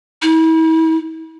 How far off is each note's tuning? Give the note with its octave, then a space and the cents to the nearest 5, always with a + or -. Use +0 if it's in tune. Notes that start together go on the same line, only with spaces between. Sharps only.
E4 -35